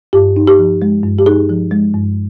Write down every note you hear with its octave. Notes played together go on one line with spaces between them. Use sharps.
G2 G4
D#4
G4
F3
G#3
G2
G4
D#4 G#4
F3
G#3
G2